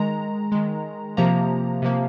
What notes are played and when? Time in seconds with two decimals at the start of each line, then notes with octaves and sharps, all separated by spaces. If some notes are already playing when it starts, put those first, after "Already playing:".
Already playing: D#3 G#3 A#5
0.52 D#3 G#3
1.17 C3 F3 A#3 A#5
1.82 C3 F3 A#3